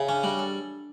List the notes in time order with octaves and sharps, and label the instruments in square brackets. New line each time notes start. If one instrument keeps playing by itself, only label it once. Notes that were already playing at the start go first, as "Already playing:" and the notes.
Already playing: [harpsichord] C#3 [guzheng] E4
[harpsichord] C#4 [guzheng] D4
[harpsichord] G3 [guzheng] F#4
[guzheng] A4